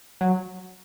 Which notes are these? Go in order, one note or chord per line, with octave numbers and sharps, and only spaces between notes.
F#3